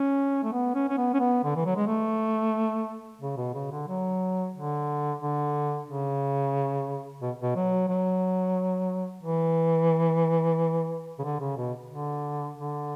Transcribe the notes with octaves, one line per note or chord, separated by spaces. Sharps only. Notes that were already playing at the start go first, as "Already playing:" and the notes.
Already playing: C#4
A3
B3
C#4
C#4
B3
C#4
B3
D3
E3
F#3
G#3
A3
C#3
B2
C#3
D3
F#3
D3
D3
C#3
B2
B2
F#3
F#3
E3
C#3
D3
C#3
B2
D3
D3